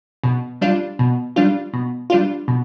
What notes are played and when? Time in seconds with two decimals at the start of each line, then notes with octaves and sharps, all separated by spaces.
0.23 B2
0.61 G3 D4 F4
0.99 B2
1.36 G3 D4 F4
1.74 B2
2.10 G3 D4 F4
2.48 B2